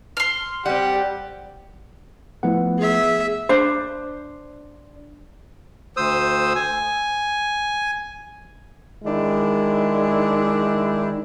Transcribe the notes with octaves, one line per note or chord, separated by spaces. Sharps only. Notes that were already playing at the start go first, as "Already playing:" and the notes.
C6 F6
G3 C4 G4 F#5
F3 A3 B3 E4 F#5
G#4 E5
D4 C5
D2 C5 D#6 E6
G#5
D#3 G#3 D4 E4